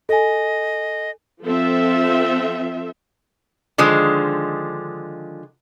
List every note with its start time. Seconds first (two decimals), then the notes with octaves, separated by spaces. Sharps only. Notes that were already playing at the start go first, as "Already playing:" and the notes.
0.09 A4 D#5 G#5
1.43 F3 C4 A4 E5
3.78 D3 D#3 F3 G#3